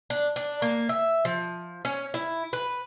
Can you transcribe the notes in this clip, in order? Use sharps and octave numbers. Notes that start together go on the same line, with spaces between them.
D4
D4
A#3
E5
F3
C#4
E4
B4